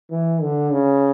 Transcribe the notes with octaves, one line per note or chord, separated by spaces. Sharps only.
E3
D3
C#3